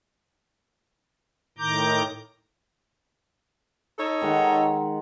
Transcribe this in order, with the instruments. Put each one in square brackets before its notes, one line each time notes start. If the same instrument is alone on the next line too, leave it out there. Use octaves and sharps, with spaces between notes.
[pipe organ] A2 D#3 A#5 D6 G6
[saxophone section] D#4 A4 C#5
[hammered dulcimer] D#3 G#3 F#5